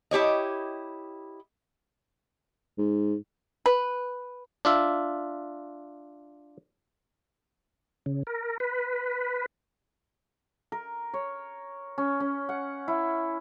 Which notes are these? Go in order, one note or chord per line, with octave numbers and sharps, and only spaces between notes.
E4 G4 C#5 D#5
G#2
B4
D4 F4 E5
C#3
A#4
B4
A#4
C#5
C#4
C#4
F#5
E4